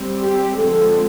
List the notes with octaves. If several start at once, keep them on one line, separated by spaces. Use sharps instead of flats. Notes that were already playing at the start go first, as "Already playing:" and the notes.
Already playing: G3 C4
G4
D3 F3 G#3 C4 A4